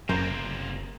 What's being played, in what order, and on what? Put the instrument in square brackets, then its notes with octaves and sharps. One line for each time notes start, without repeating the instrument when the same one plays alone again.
[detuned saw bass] F#1 [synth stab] F#2 [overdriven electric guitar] C3 A#3 [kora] A#4 C5